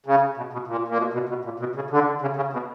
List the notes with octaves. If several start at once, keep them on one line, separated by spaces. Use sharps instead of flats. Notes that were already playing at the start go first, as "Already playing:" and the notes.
C#3
B2
B2
A#2
A#2
B2
B2
B2
A#2
B2
C#3
D3
C#3
C#3
B2